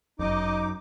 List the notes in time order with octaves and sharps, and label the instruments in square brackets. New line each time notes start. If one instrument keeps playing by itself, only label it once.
[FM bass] G1 [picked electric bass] F#2 [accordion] D#4 D6 [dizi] D#5